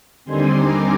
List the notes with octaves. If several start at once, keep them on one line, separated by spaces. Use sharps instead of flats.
D#2 D3 G3 C4 D#4 G#5 C6
A#5 D6